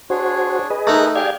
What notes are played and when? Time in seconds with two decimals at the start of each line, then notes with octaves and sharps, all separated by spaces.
0.10 D4 F#4 G#4 C5 C#5
0.70 G#4 B4 D#5
0.87 A3 D#4 A#4 A#5 F#6
1.16 G4 G#4 D5 F5 G#6